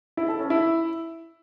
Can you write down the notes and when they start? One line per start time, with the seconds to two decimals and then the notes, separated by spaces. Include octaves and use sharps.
0.17 E4
0.28 A4
0.39 C#4
0.50 E4